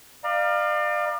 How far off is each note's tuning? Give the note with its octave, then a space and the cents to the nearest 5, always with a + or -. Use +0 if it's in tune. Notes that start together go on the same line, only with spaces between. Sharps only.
D5 +40 F5 +0 A#5 +30